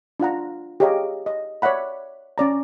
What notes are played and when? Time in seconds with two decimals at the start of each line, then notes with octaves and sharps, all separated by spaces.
0.20 D4 F4 F#5 A#5
0.80 G4 G#4 C#5 D#5 F5 A#5
1.26 D#5
1.62 C#5 D5 E5 F#5 B5
2.38 C#4 D5 A#5